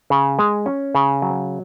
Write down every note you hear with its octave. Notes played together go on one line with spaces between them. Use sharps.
C#3
G#3
C#4
C#3
F#3